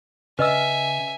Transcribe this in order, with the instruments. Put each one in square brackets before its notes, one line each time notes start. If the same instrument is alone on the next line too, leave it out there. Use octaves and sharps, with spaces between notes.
[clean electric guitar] C#3 [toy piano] B4 D#5 E6 [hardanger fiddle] E5 G#5